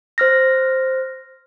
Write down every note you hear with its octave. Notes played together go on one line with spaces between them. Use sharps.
C5 F6 A#6